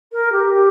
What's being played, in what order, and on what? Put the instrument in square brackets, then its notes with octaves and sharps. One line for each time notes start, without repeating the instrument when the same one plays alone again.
[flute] A#4
G4
G4